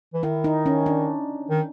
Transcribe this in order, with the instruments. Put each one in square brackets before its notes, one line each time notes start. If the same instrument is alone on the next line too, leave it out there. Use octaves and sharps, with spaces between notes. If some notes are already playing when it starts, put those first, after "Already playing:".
[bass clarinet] E3
[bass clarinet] D#3 [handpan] E4
[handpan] D#4
C#4
D4
[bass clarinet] D#3